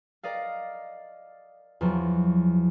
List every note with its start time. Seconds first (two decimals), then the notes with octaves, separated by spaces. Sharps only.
0.23 A#4 D5 D#5 F5
1.81 E2 F3 F#3